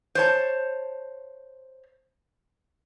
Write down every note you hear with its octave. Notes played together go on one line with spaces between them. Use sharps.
C5 C#5 A5